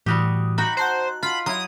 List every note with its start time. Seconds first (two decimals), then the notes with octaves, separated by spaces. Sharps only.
0.06 A2 E3 G3 F#4 G4 D#6
0.58 D#4 F#4 G5 B5
0.77 C5 F#5 A5 F#6
1.23 F4 B5
1.46 F#3 E4 D#6